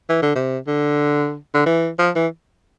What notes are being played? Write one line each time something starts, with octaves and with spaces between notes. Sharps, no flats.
E3
D3
C3
D3
D3
E3
F3
E3